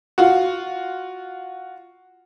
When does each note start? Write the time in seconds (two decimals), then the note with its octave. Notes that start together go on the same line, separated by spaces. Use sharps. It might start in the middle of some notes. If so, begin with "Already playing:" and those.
0.18 F4 F#4